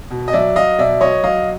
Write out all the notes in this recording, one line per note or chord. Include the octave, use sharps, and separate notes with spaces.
B2
D#5
F#3 D5 E5
F#3 D#5 F5
B2 D5 E5
F#3 C#5 D#5
F#3 D#5 F5